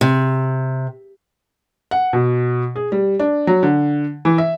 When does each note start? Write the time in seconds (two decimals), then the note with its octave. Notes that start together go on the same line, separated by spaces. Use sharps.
0.01 C3
1.91 F#5
2.13 B2
2.76 G#4
2.92 G3
3.19 D4
3.47 F#3
3.63 D3
4.25 E3
4.38 E5